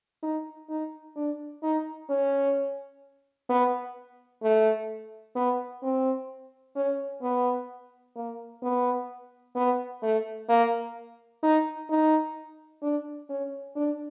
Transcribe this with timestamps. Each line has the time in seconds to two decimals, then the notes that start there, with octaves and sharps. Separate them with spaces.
0.23 D#4
0.70 D#4
1.16 D4
1.63 D#4
2.10 C#4
3.50 B3
4.43 A3
5.36 B3
5.83 C4
6.76 C#4
7.23 B3
8.16 A#3
8.63 B3
9.56 B3
10.03 A3
10.49 A#3
11.43 D#4
11.90 D#4
12.82 D4
13.30 C#4
13.76 D4